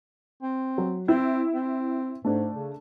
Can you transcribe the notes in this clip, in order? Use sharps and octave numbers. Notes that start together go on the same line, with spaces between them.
C4
F#3
C4 E4
C4
G#2 A3 D4
C#3